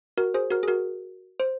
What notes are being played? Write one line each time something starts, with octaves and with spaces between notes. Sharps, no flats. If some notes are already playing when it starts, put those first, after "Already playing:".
F#4 A#4
G#4 C5
F#4 A#4
G#4
F#4 A#4
C5